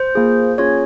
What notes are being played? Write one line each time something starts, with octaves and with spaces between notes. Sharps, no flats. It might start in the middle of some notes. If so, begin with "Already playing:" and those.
Already playing: C5
A#3 F4 G#4
A#3 C#4 F4 G#4 C#5